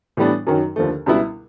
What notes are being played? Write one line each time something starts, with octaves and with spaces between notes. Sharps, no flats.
A2 E3 G3 B3 D4
F#2 D#3 F#3
D#2 D3 F3 A3
C#2 B2 G3 B3 E4